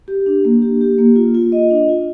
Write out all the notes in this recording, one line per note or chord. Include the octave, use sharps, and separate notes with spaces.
G4
D4
A#3
G4
G4
A#3
F4
F4
D#5
D4
F4